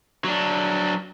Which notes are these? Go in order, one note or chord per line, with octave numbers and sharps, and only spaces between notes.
F#3 D4